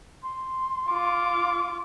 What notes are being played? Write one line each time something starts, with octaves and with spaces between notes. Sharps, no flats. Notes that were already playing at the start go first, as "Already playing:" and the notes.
C6
F4 D6